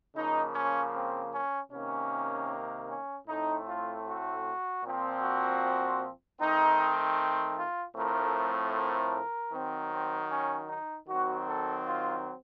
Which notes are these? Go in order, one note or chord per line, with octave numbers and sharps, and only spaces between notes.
C#3 F3 A#3 D#4
C#4
C4
C#4
C3 D#3 A#3 C#4
C#4
A2 A3 C4 D#4
F4
F#4
A#2 F3 C4
F#4
D#3 A3 C4 D#4
F4
A2 F3 A3 C4 A#4
A#4
D#3 F#3 C4
C4
C#4
D#4
D#3 F#3 C4 F#4
A4
F4